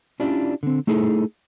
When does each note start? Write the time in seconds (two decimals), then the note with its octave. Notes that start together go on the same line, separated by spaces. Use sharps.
0.20 C#4 D4 E4 F4 G4 D5
0.63 D3 C4
0.87 A3 D#4 E4 G#4 A4